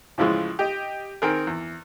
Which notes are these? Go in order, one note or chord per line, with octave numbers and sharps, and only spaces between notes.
A2 C#3 E3 F3 G#3
G4 D#5
D#3 C4 G#4 A#4
E2